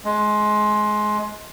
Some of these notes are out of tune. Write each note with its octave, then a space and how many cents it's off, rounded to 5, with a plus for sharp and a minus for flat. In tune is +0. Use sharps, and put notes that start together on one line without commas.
G#3 +20